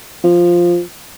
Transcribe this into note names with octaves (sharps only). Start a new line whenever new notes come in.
F3